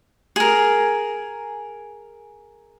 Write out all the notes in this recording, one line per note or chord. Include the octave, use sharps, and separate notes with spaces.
G#4 A#4